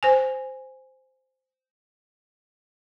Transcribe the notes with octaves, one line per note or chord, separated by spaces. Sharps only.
C5 G#5